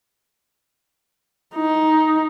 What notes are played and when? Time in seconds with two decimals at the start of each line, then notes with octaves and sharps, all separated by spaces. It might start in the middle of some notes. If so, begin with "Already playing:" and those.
1.55 D#4